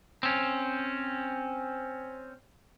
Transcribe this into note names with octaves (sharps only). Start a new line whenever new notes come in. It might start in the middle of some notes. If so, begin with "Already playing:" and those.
C4 C#4